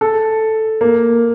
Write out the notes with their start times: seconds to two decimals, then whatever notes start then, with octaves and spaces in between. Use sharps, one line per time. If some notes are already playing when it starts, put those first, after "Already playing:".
0.01 A4
0.81 A#3